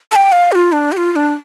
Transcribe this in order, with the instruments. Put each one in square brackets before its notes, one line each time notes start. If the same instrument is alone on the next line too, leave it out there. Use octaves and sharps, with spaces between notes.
[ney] A5
G5
F5
G4
F4
D4
G4
F4
F4
D4